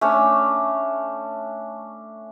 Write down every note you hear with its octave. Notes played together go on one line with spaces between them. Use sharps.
A3 C#4 D4 C#5